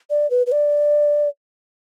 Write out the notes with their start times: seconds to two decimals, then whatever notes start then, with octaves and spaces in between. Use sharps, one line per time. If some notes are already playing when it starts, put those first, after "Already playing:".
0.10 D5
0.30 B4
0.47 B4
0.52 D5